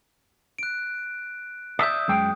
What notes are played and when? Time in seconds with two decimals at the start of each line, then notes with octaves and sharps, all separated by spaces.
0.59 F#6 D7
1.79 D5 E5 D#6 G6
2.08 F#2 G#3 G5